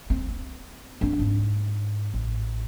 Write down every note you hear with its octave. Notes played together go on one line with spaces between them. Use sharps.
C4
C4 D4
G#2
A1